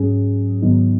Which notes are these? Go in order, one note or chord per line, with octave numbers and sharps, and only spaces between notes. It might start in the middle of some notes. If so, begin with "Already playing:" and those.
Already playing: G#2 F#3 C#4 G#4
G#2 D#3 F#3 B3 D#4